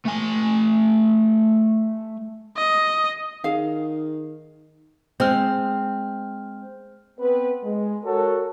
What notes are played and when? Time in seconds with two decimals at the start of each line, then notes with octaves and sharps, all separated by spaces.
0.05 A3 G#5
2.57 D#5
3.44 D#3 G#4 F5
5.20 G#3 C4 C5 F6
7.19 B3 C4 B4
7.64 G#3
8.04 F#4 A4 A#4 C#5